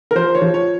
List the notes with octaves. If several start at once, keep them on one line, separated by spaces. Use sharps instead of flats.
A#4
F3 C5
C#5
F3
C#5